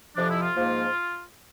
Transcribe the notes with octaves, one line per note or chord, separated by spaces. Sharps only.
F2 C3 F3 D4
E4
F4
G#2 F3 A#3